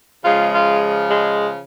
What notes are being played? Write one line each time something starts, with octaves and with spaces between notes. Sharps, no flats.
C#3 F3 G#3 F4
F4
G#3